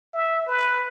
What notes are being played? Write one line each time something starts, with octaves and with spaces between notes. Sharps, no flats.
E5
B4